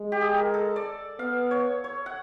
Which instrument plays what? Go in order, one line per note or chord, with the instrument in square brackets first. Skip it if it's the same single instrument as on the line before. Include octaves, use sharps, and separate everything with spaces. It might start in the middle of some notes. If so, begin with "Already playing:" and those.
Already playing: [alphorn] G#3
[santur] G4
G#4
A#4
A4
D5
[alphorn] B3 [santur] F5
[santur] C#5
C#5
F#5